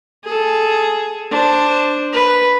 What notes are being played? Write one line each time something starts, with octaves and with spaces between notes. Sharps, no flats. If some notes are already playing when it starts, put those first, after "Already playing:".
G#4 A4
D4 C5
B4